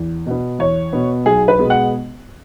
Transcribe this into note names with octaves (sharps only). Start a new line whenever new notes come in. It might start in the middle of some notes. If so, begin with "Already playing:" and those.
Already playing: E2
B2 B3
E2 C#5
B2 B3
B1 G#4
B4
B2 G#3 B3
F#5